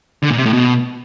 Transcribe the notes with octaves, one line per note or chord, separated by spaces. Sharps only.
D3
A#2
C3
A2
B2